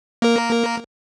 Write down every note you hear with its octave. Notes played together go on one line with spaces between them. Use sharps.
A#3 A#4